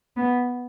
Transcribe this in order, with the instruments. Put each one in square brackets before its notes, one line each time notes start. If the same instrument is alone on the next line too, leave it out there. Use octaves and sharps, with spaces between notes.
[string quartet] B3